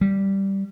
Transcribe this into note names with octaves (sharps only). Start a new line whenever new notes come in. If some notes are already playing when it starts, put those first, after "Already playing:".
G3